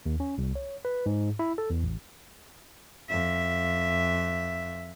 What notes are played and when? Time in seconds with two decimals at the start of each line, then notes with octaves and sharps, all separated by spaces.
0.06 D#2
0.20 C#4
0.38 C2
0.55 C#5
0.85 B4
1.06 G#2
1.39 E4
1.58 A4
1.70 E2
1.83 A1
3.09 F2 E5